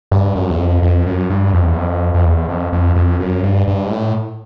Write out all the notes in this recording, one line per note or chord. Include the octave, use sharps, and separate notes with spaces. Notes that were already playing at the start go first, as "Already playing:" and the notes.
G2
F#2
E2
F2
F2
F#2
G2
F2
E2
F2
F2
E2
F2
F2
F2
F#2
G2
G2
G#2
A2